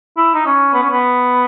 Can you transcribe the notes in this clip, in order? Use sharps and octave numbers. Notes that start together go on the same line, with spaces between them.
E4
D#4
C#4
B3
C#4
B3